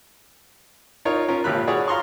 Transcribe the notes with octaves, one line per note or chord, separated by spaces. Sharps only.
D#4 F4 A#4 C#5
C#4 F4 A#4
G#1 A#2 F4 G4 B5 F#6
F#4 G#4 C#5 D5
F5 A#5 C6 C#6